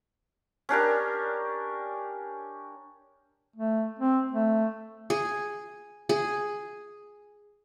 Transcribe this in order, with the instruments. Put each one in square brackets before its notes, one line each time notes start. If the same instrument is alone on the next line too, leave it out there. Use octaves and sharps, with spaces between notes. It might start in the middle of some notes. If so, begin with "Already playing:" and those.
[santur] C#4 D4 G4 A#4
[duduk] A3
C4
A3
[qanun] G#4
G#4